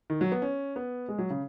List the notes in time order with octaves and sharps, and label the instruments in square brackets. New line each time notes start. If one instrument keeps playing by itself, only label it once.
[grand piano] D#3
F#3
B3
C#4
B3
G#3
F#3
C#3